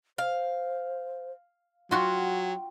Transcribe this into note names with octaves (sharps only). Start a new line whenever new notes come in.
C5 F5
F#3 F4 F#4 G5